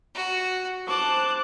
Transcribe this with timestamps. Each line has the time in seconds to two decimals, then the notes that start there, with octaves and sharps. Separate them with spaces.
0.15 F#4
0.87 C5 A5 D6 F#6